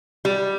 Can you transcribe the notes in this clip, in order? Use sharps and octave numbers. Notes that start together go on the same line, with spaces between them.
G3